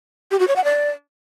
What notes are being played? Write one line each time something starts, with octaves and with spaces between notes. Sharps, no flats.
G4
F#4
C#5
F#5
D5